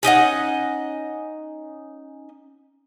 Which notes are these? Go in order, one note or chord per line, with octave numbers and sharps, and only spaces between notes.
C#4 D#4 D#5 F#5